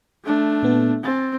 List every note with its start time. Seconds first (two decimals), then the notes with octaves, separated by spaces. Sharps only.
0.24 A3 D4
0.63 A#2 B3 A4
1.04 C4 G#5 A6